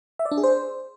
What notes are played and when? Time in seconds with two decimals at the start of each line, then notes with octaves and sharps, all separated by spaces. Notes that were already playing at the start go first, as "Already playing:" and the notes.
0.19 E5
0.25 D5
0.31 D4
0.37 G#4
0.44 C5